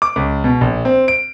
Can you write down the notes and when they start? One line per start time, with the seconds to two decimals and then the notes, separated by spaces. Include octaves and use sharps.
0.02 D6
0.16 C#2
0.44 B2
0.61 A#1
0.85 C4
1.08 D7